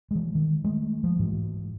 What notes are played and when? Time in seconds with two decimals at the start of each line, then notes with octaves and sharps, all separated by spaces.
0.11 E3 G#3
0.35 D#3
0.64 G#3 A3
1.04 F3
1.19 G#2 E3